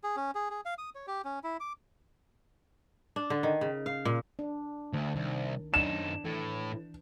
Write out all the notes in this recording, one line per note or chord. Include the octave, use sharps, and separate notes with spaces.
G#4
C#4
G#4
G#4
F5
D#6
C#5
G4
C#4
E4
D6
D4
D3
D#3
C#3
F5
A#2
D4
D2
C2 D#3
F#2 D4 D#4 E7
A2 E3